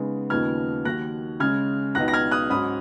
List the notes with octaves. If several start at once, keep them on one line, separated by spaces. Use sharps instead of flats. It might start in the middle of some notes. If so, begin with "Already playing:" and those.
Already playing: C#3 G#3 B3 D#4
D#2 C#3 F3 B3 D#4 F6 G#6
D#2 D#3 F#3 F#6 A#6
C#3 G#3 C#4 F6 G#6
C#2 B2 F#3 B3 D#4 F#6 A#6
A#6
F6 G#6
D#6 F#6
G#2 F#3 C#4 B5 D#6